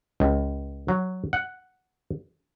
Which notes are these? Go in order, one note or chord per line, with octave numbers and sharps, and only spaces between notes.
C#2
F#3
F#5